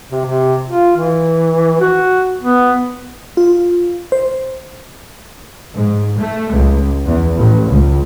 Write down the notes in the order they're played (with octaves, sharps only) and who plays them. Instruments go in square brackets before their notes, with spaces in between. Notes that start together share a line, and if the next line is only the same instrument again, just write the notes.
[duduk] C3
C3
F4
E3
F#4
B3
[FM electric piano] F4
C5
[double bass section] G#2
A3
C#2
E2
A1
C#2